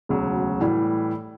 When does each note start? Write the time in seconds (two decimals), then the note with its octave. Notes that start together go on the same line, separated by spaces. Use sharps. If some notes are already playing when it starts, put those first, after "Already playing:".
0.09 E1 D2 C#3 F#3
0.61 A2 E3 G3